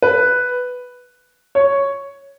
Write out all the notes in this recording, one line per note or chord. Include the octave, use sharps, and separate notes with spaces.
B4
C#5